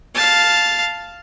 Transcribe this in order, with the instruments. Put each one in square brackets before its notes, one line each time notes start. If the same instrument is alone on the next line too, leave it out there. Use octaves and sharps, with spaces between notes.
[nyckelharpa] F5 A5